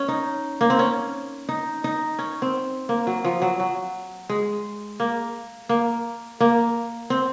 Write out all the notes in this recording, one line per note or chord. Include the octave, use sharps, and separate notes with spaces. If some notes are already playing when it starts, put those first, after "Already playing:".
Already playing: C#4
D#4
A#3
C4
C#4
D#4
D#4
C#4
C4
A#3
F#3
F3
F#3
F#3
G#3
A#3
A#3
A#3
C4